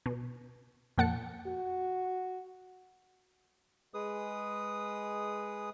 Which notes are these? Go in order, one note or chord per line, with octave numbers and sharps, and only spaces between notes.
B2
F2 A#2 F#5 A5 C#7
F#4
G#3 G#4 B4 D#6